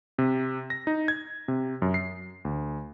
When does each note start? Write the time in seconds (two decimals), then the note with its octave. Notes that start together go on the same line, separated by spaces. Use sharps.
0.18 C3
0.70 A#6
0.87 D#4
1.08 G#6
1.48 C3
1.82 F#2
1.94 C7
2.45 D2